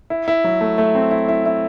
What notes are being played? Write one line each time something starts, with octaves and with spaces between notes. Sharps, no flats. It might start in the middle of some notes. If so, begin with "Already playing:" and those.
E4
E4
F#3
A3
A3
C4
E4
E4
E4